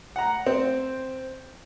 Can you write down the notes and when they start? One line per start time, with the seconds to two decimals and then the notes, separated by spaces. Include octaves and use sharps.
0.16 F#5 A#5
0.46 C4